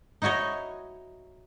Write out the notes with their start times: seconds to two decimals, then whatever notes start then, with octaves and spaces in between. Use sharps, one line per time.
0.22 D#4 E4 F#4 C#5 D#5